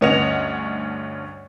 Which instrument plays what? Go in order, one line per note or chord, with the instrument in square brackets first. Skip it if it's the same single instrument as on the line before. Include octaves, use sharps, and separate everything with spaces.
[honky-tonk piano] D2 G2 C#4 D#5 F#5 F7